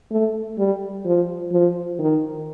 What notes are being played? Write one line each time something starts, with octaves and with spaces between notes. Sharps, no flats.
A3
G3
F3
F3
D#3